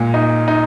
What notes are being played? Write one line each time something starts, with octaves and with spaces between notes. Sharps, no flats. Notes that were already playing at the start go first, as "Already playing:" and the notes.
Already playing: A#2 G#3
D#4
D#4